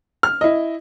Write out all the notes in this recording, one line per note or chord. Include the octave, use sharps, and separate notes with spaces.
F6
E4 D#5